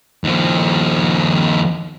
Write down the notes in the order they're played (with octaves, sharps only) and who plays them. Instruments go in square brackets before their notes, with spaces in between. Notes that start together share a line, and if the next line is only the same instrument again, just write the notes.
[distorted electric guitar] D#2 F3